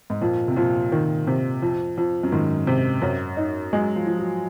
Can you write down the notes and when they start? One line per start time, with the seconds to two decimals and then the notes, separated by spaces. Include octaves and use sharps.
0.10 G#2
0.21 F2 A#2
0.48 C3
0.56 F2 A#2
0.92 D#3
1.27 C3
1.62 F2
1.97 F2
2.23 F#2
2.32 G#2 D#3
2.67 C3
3.02 F#2
3.37 D#4
3.73 F#3 G#3
3.96 F3
4.07 F3
4.19 F#3